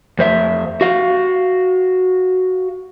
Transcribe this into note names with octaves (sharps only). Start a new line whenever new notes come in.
F2 C5 E5
F#4 F5